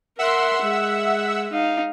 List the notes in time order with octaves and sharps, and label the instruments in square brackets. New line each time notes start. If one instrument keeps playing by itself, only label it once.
[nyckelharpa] A#4 C6 [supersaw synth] E5 F#5 E6
[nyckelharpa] G#3
D#4 F5